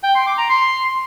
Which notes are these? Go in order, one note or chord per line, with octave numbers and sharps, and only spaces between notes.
G5
C6
D6
A#5
C6